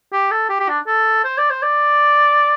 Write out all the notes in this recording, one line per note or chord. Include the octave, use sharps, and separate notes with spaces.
G4
A4
G4
G4
D4
A4
C5
D5
C5
D5